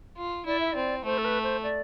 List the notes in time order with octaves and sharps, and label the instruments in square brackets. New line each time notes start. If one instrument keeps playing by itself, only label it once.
[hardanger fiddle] F4
[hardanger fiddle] E4 [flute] D5
[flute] E5
[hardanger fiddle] C4 [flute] D5
[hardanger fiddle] A3 [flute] C5
[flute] A4
B4
C5
D5